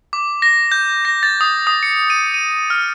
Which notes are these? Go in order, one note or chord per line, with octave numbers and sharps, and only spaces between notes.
D6
A#6
G6
A#6
A6
D#6
D#6
C#7
D#7
D#7
F6